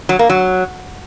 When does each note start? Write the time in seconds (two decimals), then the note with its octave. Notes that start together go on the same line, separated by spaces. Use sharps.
0.09 F#3
0.19 A#3
0.30 F#3